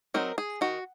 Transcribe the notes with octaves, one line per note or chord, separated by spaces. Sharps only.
F#3 C4 D#4 A#4
G#4
D#3 F#4